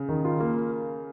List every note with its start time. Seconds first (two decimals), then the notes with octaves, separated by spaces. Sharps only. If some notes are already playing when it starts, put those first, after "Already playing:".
Already playing: C#3
0.09 D#3
0.25 F4
0.40 A#3